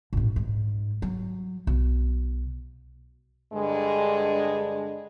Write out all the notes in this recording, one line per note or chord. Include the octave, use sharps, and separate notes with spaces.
A#1 A2
G#2
F#3
B1
G2 D3 G#3